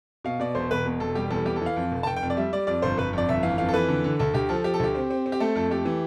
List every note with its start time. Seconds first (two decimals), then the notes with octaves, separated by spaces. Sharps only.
0.24 B2 F5
0.40 B2 D5
0.55 E1 C5
0.71 E1 B4
0.85 B2
1.00 E1 A4
1.15 G3 G4
1.31 E2 A4
1.46 E3 G4
1.56 A4
1.61 E3 F5
1.76 F2
1.92 F1
2.03 A5
2.06 F1 G5
2.16 G5
2.23 F2
2.30 D5
2.37 G3 E5
2.53 G3 D5
2.67 F2 D5
2.82 G1 C5
2.98 G1 B4
3.13 F2 D5
3.29 G1 E5
3.43 E3 F5
3.58 F2 F5
3.69 A4
3.74 E3 B4
3.89 D3
4.04 D3
4.19 D2 A4
4.34 D2 G4
4.49 F3 A4
4.64 F3 G4
4.74 A4
4.80 D2 G4
4.95 C4
5.11 C4
5.26 C4
5.32 G4
5.40 A3 A4
5.56 F2 A4
5.70 A3 G4
5.85 E3